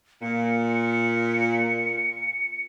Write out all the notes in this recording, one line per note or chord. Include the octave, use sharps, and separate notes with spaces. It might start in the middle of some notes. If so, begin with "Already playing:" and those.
A#2 C#7